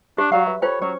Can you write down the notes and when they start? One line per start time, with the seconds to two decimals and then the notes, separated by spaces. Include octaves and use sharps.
0.18 D4 G4 D5
0.32 F#3 F#4 D5 F5
0.46 B4 E5
0.62 F4 A4 C5 C#5 G5 A#5 B5
0.81 F#3 C#4 C#5